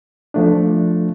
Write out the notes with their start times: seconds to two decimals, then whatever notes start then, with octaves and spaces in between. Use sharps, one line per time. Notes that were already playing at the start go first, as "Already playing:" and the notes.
0.34 F3 A3 D4